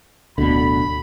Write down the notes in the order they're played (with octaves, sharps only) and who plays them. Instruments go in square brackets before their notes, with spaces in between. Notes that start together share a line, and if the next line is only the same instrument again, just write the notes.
[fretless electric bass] D1 D3 [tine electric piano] D2 B2 [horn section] B5